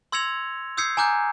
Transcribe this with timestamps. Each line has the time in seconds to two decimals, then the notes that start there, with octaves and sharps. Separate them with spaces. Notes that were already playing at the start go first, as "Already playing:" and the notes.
0.12 C6 E6 G#6 A#6 C#7 F7
0.77 D#6 E6 G6 G#6 C7 C#7
0.97 G#5 A#5 D6 F#6 G6